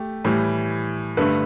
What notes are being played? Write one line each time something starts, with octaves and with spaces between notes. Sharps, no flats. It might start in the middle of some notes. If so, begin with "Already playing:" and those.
Already playing: A3 G4
A2 E3 G3
G2 D3 A3 B4